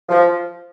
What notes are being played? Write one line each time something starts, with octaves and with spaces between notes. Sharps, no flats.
F3